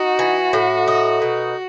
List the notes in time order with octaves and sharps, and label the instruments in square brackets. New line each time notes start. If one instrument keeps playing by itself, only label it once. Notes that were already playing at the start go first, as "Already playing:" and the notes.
Already playing: [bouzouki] D#4 [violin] F#4
[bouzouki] E3
A2
D#4
B2